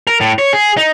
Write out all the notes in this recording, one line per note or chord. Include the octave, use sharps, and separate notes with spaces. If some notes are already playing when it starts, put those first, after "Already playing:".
A#4
A2
C#5
G#4
D#4